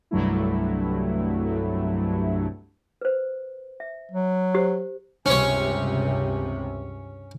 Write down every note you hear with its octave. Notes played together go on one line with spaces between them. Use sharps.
C2 G2 F#3 A3 E4
B4 C5
E5
F#3
G4 C5
C#2 G2 C3 C#4 C#5